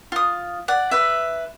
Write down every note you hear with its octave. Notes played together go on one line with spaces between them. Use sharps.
F4 D#6
D5 F#5
B4 E5